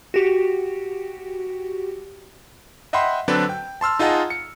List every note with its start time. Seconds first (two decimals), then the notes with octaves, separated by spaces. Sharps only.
0.14 F#4 G4
2.93 D#5 E5 F#5 G5 B5 C6
3.28 D3 F#3 C4 D4 A4 B4
3.49 G5
3.81 A5 C6 E6 F6
3.99 D#4 F4 G#4 D#5 F#5 A5
4.30 C#7